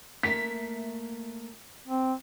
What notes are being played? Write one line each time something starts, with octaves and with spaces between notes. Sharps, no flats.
A3 A#3 E5 B6
C4